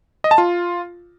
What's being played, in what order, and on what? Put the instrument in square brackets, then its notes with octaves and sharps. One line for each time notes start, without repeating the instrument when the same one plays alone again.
[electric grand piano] D#5
A5
F4